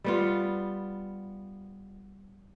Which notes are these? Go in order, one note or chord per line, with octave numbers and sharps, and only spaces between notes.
G3 B3 F4